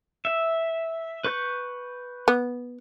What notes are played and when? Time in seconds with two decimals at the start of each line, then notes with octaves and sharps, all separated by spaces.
0.25 E5
1.24 B4 C#6 G6
2.28 B3